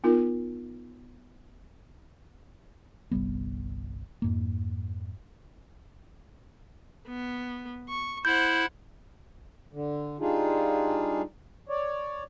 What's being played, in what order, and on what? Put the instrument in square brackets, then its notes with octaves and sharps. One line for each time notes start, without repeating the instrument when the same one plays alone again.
[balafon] B3 D#4 F4 A#4
[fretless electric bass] G1 C2 G3 B3
F2 G#2 A#3
[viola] B3
C#6
[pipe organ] E4 [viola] C5 F#5 [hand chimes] G6
[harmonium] D3
G3 D4 D#4 F4 G#4
C#5 D5